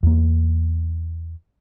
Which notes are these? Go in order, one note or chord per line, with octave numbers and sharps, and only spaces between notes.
E2 A#3